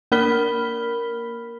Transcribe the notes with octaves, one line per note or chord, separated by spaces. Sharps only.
A#3 A#4 B5 F6 B6 G7